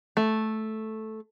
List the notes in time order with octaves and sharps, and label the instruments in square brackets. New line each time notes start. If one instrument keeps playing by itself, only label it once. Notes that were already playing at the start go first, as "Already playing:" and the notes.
[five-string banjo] A3